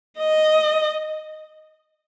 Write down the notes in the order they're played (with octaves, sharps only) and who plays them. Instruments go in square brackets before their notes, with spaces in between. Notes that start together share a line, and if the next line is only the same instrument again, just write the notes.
[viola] D#5